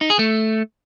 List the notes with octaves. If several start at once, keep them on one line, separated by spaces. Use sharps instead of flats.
D#4
G#4
A3